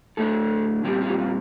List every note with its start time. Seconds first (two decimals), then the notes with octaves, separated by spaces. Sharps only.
0.17 A2 A3 D4 A4
0.84 A#2 G3 C4 G4
1.02 F4
1.09 G4
1.18 F4